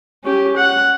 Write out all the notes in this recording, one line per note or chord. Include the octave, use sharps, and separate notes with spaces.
C#4 G4
F#5